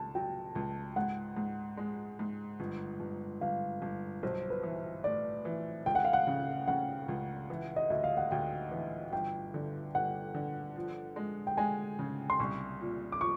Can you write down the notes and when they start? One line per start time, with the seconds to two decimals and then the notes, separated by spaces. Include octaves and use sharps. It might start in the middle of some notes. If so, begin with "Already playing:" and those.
Already playing: C#2 A5
0.15 F#3 G5
0.55 C#2
0.96 G#2 F#5
1.37 G#2
1.77 G#3
2.19 G#2
2.60 G1
3.00 G1
3.41 G1 F5
3.82 G1
4.23 B1 C5
4.50 B4
4.63 E3
5.04 A2 D5
5.45 E3
5.86 C#2 G5
5.95 F#5
6.05 F5
6.13 F#5
6.27 C#3
6.68 C#3 F#5
7.08 C#2
7.50 E3
7.76 D#5
7.90 D2 E5
8.04 F5
8.17 F#5
8.31 D2 G5
8.71 E3
9.12 G1 G5
9.54 D3
9.95 G1 F#5
10.34 D3
10.76 F3
11.16 G#3
11.47 G5
11.57 G#3 G#5
11.99 C#3
12.30 C6
12.40 C2 C#6
12.81 A#2
13.12 D6
13.21 F3 C#6